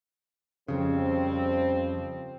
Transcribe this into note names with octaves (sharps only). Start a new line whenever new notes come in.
F2 C#3 F3 G3 C4